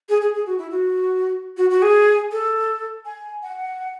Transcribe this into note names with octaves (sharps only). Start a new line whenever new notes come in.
G#4
G#4
G#4
F#4
E4
F#4
F#4
F#4
G#4
A4
G#5
F#5